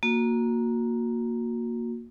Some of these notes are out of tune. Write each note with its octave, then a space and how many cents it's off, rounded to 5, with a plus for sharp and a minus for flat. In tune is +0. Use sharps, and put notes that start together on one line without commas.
A#3 +0 F#4 -25